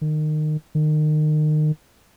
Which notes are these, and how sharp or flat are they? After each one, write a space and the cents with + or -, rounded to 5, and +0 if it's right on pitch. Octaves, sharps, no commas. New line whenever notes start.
D#3 -25
D#3 -30